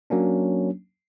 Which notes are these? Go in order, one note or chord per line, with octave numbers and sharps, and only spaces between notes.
F#3 A#3 C#4 D4